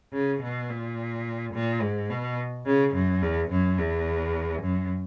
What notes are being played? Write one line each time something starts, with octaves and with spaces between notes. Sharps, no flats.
C#3
B2
A#2
A#2
G#2
B2
C#3
F#2
E2
F#2
E2
F#2